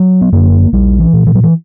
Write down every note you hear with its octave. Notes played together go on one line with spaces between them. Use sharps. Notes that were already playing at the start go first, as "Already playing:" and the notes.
Already playing: F#3
B3
F#2 D3 A#3
A#1 G3
E3
A#2
E3
F#3
E3